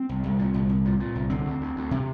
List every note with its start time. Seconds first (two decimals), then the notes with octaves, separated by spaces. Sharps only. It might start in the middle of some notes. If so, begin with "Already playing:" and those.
Already playing: C4
0.09 C2
0.24 C2
0.39 A#2
0.54 C2
0.69 C2
0.85 A#2
1.00 A#2
1.15 C2
1.30 D3 C4
1.45 D2
1.61 D2
1.76 D2
1.91 C3